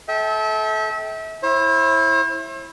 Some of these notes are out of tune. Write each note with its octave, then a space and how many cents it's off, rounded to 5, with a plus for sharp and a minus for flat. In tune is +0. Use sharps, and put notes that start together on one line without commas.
A4 -25 E5 -35 G5 +0
E4 +0 C5 +45